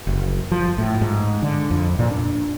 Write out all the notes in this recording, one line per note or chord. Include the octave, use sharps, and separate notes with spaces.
F#1
F3
A2
G#2
D3
F2
A#2
D4